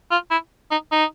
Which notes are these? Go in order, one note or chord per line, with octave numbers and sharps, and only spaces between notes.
F4
E4
D#4
D#4